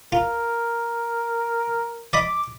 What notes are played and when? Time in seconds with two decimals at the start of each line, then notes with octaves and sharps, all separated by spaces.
0.12 F4 A#4
2.13 D5 D#5 B5 D6